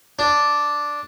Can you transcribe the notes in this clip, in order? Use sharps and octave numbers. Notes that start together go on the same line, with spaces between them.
D4